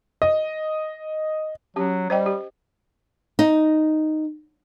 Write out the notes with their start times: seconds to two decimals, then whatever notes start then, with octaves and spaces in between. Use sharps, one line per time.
0.22 D#5
1.76 F#3 C#4 G4
2.10 G3 C5 D#5 G5
2.26 G4
3.39 D#4